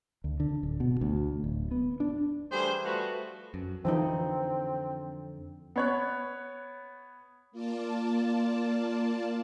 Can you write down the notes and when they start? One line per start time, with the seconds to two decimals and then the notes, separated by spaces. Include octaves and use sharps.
0.24 D2
0.40 D3
0.63 D1
0.80 B2
1.01 D2
1.44 D1
1.71 B3
2.00 D4
2.51 E3 G3 A3 G#4 C5
2.85 F3 G3 A3 B3 F#4
3.54 F#2
3.85 F2 D3 E3 F3 C4 D#4
5.76 B3 C#5 F#6
7.52 A#3 F4 D5 A5